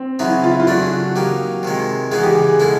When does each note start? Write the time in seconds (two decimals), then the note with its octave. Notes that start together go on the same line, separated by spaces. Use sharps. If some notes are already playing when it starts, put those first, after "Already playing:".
Already playing: C4
0.19 C#3 F#3 B3 D#4 E4
0.44 F4
0.51 E4
0.60 F4
0.67 C#3 F#3 A3 D4 F#4
1.15 F#3 A#3 D#4 G4
1.63 C3 D#3 G#3
2.11 C#3 E3 G#3 B3 D#4 G#4
2.23 G4
2.35 G4
2.48 G#4
2.60 B2 G#3 C#4 E4 A4